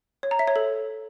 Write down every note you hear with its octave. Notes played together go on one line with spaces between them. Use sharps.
C#5
A#5
E5
C#5
A4